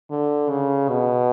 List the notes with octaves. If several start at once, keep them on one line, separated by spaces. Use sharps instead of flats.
D3
C#3
B2